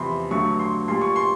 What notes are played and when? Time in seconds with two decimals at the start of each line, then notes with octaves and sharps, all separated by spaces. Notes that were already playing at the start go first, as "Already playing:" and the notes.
Already playing: E2 C3 F3 B5 C6
0.31 G2 D3 F#3 A3 C#6
0.59 C6
0.88 A#2 G3 C6
1.01 C#6
1.16 C6